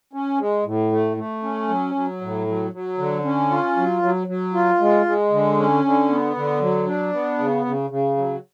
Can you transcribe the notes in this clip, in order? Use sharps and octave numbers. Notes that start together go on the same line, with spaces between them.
C#4
G#3
A2
A3
A3
C#4
F#3
F#3
A2
F#3
F#3
D3
C#4
F4
F#3
F#3
F#3
F4
G#3
G#3
D3
C#4
D3
B3
D3
F#3
D4
B3
C#3
C#3
C#3
F#3